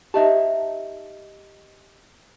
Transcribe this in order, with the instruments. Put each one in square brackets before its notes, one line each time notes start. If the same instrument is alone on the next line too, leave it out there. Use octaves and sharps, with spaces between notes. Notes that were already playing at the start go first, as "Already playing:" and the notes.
[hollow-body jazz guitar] D#4 E5 A5 [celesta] G4 D#5